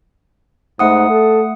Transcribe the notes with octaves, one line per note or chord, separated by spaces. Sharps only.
G#2 A3 F#5 D#6
A4